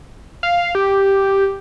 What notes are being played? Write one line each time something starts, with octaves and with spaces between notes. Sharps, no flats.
F5
G4